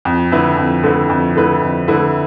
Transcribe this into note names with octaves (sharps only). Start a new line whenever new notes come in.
F2
D3 A3 E4 B4
F2
D3 A3 E4 B4
F2
D3 A3 E4 B4
F2
D3 A3 E4 B4